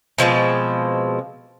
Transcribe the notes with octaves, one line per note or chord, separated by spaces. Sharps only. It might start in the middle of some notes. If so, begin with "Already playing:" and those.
B2 F3 G#3 C4